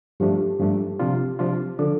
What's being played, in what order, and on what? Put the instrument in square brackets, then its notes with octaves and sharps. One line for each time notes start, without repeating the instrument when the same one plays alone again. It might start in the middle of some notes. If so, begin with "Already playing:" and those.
[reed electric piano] G2 F3 A3 D4 [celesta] G4
[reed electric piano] G2 F3 A3 D4
C3 F3 D4 F4
C3 F3 D4 F4
[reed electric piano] D3 F3 D4 [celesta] A4